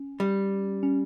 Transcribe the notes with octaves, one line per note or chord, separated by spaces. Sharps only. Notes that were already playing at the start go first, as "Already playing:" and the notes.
Already playing: C#4
G3
C#4